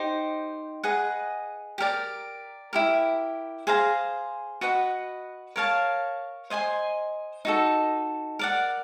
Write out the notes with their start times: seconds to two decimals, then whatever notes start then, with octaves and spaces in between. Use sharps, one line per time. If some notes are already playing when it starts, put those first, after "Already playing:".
Already playing: D#4 G4 C5
0.84 G#4 B4 D#5 F#5
1.78 G4 A#4 D5
2.73 E4 G4 A#4
3.67 G#4 C5 F5 A#5
4.61 F#4 B4 D#5 F#5
5.56 A#4 C#5 F5 A5
6.50 C5 D#5 G#5 C6
7.45 D#4 F#4 A4
8.39 A#4 D5 F#5